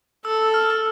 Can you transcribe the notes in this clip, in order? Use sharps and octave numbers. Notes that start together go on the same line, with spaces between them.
A4 E6
F6